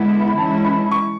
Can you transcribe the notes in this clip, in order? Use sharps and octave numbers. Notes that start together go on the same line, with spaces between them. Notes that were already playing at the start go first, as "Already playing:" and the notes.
Already playing: D3 G#3 B3 E4 F#5
B5
E3 G#3 C#4 E4 A5
B5
C#6